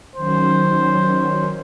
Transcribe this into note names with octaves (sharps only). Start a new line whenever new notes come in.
D#3 F#3 C#4 C5